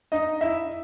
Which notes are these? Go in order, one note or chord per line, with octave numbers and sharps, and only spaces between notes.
D#4 D#5
E4 E5